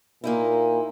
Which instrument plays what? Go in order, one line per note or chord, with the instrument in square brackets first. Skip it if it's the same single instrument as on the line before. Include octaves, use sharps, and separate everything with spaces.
[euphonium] A#2 [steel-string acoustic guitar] A#3 D#4 E4